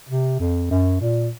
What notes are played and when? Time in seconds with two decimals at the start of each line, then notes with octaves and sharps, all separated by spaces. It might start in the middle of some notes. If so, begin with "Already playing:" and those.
0.09 C3
0.40 F2
0.71 F#2
1.01 A#2